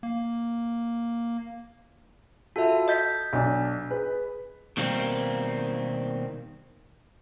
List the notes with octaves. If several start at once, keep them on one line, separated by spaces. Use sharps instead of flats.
A#3
F4 F#4 A4 E5
D#5 G6 B6
B1 D4
G#4 B4
B2 D#3 G3 A#3 C4